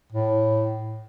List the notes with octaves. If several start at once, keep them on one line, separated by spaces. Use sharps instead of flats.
A2